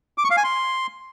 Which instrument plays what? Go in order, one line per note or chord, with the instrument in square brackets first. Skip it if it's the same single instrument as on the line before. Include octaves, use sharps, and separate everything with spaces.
[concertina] D6
C#6
F5
G#5
C6